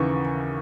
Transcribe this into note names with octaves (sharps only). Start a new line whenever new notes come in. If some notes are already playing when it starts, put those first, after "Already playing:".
Already playing: D#2 C#3 E3 C#6